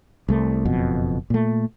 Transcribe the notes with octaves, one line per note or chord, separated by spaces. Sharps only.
C2 A3
F#1 F2 B2
A#2 A3